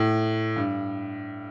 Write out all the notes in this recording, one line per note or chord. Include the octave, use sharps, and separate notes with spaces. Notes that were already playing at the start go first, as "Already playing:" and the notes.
Already playing: A2
G2